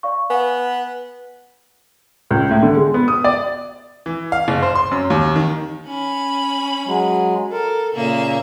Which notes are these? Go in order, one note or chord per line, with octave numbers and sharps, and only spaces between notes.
D5 F5 C#6
B3 G#5
C#2
A2
D3
G#3
B3
D#6
D5
E3
F5
F#1
C5
C6
F#2
D#2
D#3
C#4 B5
F#3 G#3
A4 A#4
A#2 C#3 A#3 E5